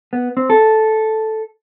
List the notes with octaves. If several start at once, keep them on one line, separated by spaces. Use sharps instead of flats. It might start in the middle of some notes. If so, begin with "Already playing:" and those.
B3
C4
A4